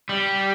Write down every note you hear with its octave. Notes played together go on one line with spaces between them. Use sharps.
G3